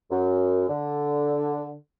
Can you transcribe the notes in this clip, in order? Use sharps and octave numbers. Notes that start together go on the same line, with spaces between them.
F#2
D3